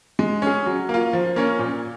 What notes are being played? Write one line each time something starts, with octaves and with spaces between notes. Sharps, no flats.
G#3
C#4 G#4
F#3
A#3 F4
F3
A#3 C#4
A#2